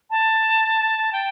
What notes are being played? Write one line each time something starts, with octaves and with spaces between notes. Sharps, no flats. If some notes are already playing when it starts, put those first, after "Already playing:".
A5
G5